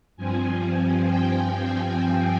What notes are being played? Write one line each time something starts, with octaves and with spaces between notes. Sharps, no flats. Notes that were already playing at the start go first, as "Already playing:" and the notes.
G2 F3 C4 G#5
G5